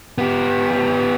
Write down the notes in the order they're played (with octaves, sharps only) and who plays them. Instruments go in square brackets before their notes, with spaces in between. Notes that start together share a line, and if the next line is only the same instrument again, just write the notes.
[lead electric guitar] B3 G4